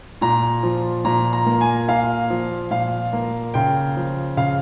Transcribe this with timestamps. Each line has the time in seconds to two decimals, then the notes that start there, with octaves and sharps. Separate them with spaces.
0.21 A#2 A#5
0.63 F3
1.05 A#2 A#5
1.33 A#5
1.46 A#3
1.61 G#5
1.88 A#2 F5
2.30 F3
2.71 A#2 F5
3.13 A#3
3.54 C#3 G5
3.96 F3
4.37 C#3 F5